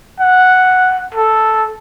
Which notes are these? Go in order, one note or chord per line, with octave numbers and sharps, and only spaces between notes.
F#5
A4